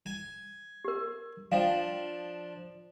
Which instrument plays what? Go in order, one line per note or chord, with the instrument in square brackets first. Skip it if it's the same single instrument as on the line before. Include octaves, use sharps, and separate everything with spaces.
[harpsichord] G#5
[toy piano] G4 A#4
[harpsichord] F3 D4 [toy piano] F5 G5